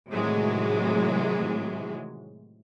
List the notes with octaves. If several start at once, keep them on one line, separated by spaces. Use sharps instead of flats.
A2 C3 D#3 E3 F#3 G#3